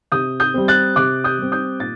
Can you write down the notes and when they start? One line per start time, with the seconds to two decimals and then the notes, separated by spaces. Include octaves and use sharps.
0.12 C3 D#6 G6
0.40 D#6 G6
0.54 G3 C4
0.68 F#6 A6
0.96 C3 D6 F#6
1.24 D#6 G6
1.39 G3 C4
1.52 D#6 G6
1.80 A#2 A6